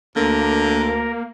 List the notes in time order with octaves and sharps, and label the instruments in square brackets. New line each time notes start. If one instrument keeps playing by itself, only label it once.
[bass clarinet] D2 [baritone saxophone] D3 [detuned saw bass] A#3 [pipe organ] A#4